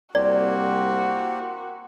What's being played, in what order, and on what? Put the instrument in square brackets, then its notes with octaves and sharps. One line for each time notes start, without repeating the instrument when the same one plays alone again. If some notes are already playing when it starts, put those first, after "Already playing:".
[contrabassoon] C2 [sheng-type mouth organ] A#3 C4 G4 [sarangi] F#4 [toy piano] D5